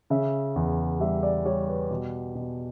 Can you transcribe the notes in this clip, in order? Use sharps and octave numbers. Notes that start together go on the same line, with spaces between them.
C#3 E5
E2
G3 E5
D5
G3 C#5
B4
B2
B2